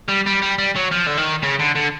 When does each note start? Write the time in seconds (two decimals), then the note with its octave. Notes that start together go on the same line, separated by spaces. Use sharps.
0.08 G3
0.26 G3
0.42 G3
0.58 G3
0.76 F#3
0.92 F3
1.07 D3
1.17 D#3
1.43 C#3
1.59 D3
1.75 D3